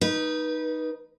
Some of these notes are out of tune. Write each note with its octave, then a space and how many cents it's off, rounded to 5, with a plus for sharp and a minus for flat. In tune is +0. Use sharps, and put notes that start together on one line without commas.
D#4 +0 B4 -25